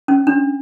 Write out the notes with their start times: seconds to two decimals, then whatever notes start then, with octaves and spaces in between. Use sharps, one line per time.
0.08 C#4
0.27 D4